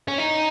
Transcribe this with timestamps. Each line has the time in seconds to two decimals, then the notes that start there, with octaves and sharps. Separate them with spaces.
0.08 C#4
0.18 D#4